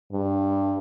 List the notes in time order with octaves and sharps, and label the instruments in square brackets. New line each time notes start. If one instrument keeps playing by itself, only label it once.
[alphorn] G2